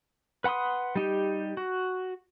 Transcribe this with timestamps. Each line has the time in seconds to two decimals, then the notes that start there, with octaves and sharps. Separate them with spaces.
0.44 B4 F#5 B5 C6 D#6
0.96 G3 D#4 G4
1.57 F#4